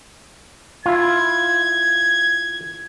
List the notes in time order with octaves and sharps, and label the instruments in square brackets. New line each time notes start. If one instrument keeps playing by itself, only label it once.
[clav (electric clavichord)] E4 F4 [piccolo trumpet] G#6